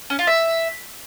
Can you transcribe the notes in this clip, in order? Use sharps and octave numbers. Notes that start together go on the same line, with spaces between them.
C#4
F4
E5